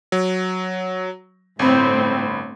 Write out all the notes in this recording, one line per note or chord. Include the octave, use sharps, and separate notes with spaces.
F#3
G1 A2 C4 B5